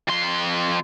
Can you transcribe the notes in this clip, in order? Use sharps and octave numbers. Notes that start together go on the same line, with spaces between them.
F2 C6